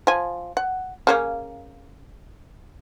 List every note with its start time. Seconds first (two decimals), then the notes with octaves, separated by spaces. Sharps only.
0.07 F3 G#5
0.57 F#5
1.07 C#3 A#3 C#4